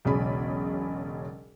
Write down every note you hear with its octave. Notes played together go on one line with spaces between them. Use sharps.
E1 B1 C#3 C#4 G#4 B5